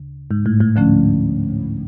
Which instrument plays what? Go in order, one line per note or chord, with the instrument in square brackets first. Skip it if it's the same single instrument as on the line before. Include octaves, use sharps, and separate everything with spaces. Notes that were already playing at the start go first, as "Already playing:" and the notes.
Already playing: [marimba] D2 C#3
[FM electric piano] G#2
A2
A2
[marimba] D2 D3 F3 A3 C#4